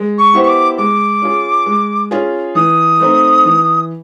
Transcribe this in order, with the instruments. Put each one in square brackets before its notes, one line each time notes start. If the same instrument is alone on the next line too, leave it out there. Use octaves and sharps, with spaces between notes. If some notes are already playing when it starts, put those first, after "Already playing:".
Already playing: [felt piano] G#3
[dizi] C#6
[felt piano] B3 E4 G4 C5
[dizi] C#6
D6
[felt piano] G#3 [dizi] D6
[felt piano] C#4 F4 G#4
G#3
C#4 F4 G#4
[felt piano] E3 [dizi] D#6
[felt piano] A3 C4 D#4
E3